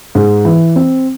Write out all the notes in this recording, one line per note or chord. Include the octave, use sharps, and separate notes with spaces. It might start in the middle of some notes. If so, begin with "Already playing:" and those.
G#2
E3
C4